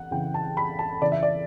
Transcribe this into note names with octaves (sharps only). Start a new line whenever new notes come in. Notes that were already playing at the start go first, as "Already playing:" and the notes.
Already playing: E3 F#5
C#3 E3 G5
A5
B5
A5
C#3 E3 D5
E5
D5